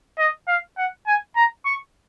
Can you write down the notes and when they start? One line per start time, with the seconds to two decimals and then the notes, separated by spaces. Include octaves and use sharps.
0.19 D#5
0.48 F5
0.77 F#5
1.07 G#5
1.36 A#5
1.65 C#6